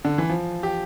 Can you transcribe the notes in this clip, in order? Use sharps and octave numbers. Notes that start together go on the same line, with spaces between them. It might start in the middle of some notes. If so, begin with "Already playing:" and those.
D3
E3
F3
G4